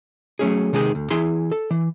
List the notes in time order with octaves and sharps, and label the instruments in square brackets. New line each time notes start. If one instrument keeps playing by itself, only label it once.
[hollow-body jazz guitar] F#3 A3 C#4 G#4
C3 D#3 G#3 D#4 G#4
D2
E3 E4 G#4 C6
A4
E3